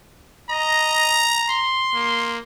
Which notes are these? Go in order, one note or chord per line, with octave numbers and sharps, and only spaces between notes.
D#5 A#5
C6
A#3